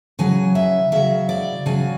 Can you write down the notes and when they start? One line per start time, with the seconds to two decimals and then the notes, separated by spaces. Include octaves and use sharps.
0.19 C#3 F#3 G#5
0.55 E5
0.92 C#3 F#3 E5
1.29 D5
1.66 C#3 F#3 G#5